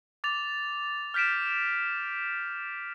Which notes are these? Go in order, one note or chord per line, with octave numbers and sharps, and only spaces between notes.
D6 A6 F7
F6 G6 B6 D7 E7